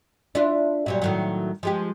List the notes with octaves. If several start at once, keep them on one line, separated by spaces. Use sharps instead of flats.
D4 E4 F4
A#2 F#3 G3
A2 D#3 F#3
F3 G#3 G4